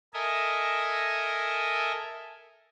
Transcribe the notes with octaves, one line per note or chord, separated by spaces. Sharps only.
A4 A#4 D#5 E5 G#5